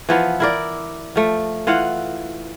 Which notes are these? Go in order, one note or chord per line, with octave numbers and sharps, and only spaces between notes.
E3 F3 B3
E4 A#4 D5
F3 A3
E3 F4 F5 F#5